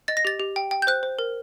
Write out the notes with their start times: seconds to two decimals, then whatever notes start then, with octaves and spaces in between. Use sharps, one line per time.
0.08 D#5 A6
0.17 A#6
0.25 G4 A6
0.40 G4
0.56 G5
0.71 G5
0.82 G6
0.87 C5 F#6
1.03 C5
1.19 A#4